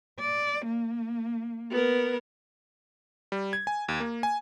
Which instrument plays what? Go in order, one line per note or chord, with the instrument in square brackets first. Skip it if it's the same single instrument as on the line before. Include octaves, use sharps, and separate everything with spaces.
[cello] D5
A#3
[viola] B3 A#4
[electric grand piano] G3
G#6
G#5
D#2
A#3
G#5